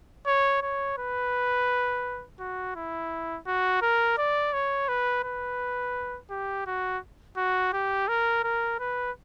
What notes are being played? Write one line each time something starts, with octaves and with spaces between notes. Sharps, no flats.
C#5
C#5
B4
F#4
E4
F#4
A#4
D5
C#5
B4
B4
G4
F#4
F#4
G4
A#4
A#4
B4